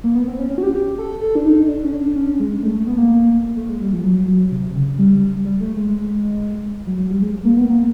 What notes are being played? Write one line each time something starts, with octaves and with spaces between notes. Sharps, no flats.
A#3
B3
C4
C#4
C#4
F#4
G4
G4
A4
A4
D4
D#4
D4
C#4
D4
C#4
G#3
A3
A3
B3
A#3
A3
G#3
G3
F3
F#3
F#3
C3
C#3
G3
G3
A3
G#3
F#3
F#3
G3
G#3
A#3
B3
A#3